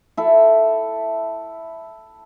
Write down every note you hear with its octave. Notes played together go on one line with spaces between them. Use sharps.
E4 A4